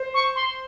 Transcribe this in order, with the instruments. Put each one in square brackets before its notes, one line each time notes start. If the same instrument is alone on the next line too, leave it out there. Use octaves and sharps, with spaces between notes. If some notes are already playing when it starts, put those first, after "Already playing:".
Already playing: [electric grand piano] C5
[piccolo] C#6
C6